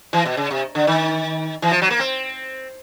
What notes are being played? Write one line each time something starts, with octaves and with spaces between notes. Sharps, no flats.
E3
B2
C#3
C3
D3
D#3
E3
F3
F#3
A#3
C4